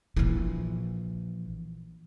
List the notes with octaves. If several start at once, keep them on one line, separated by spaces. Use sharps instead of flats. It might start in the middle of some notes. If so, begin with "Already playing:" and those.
A#1 E3